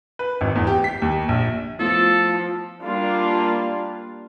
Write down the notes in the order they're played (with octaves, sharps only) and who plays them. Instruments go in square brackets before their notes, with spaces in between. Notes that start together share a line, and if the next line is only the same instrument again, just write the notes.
[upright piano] B4
G#1
E2
G4
B6
D#2
A#1
[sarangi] F3 [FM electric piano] A3 B3 E4 [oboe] A4
[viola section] G3 A#3 D4 F4